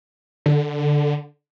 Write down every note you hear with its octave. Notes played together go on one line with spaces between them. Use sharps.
D3